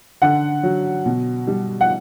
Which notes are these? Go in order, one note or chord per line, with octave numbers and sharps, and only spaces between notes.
D3 F#5
F#3
B2
G3
F#5